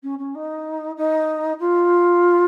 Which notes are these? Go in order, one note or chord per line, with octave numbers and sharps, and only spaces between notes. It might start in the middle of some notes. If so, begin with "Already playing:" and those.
C#4
C#4
D#4
D#4
F4